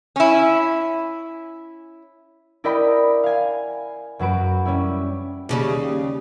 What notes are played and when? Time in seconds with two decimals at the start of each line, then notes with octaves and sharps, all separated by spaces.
0.16 C#4 E4
2.64 E4 A#4 D5 D#5 G5 B5
3.23 F5 G#5
4.19 F#2 F#3 F#4 B4 D7
4.65 G3 C#4 E4
5.49 D#2 C#3 G3